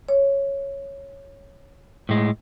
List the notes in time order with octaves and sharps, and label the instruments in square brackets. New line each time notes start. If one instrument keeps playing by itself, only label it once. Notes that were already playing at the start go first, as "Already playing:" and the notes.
[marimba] C#5
[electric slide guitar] A2 G#3